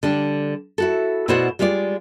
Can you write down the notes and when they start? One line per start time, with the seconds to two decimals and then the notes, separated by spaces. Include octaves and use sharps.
0.03 D3 G3 D4
0.78 E4 F#4 A4
1.28 B2 E4 F#4 C5 D5 F#5
1.59 G3 G#3 F4 C5 D5